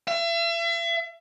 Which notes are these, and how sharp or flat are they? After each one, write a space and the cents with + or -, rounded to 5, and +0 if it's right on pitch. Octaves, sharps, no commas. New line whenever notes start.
E5 +40